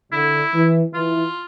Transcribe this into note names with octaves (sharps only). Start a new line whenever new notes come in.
D3 E4
E3
E3 F4